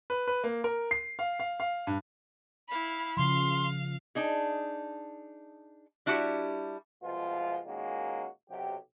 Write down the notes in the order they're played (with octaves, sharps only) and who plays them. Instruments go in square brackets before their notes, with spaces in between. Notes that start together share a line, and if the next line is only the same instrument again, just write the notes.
[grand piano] B4
B4
A#3
A#4
C7
F5
F5
F5
G2
[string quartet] E4 F5 B5
[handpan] C#3 F3 [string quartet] F5 [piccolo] C6
[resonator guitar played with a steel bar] D4 D#4 G#4
G3 D4 E4 F#4 G4
[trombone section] C2 B2 F3 G#3 F4
A#2 D#3 G#3 A#3 C#4 F#4
B1 C3 F#3 G4